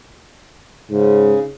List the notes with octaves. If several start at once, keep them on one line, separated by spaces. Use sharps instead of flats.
G#2 C#3